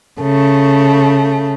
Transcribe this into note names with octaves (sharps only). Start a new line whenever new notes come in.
C#3 A3